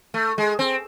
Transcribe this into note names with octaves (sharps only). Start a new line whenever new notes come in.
A3
G#3
C4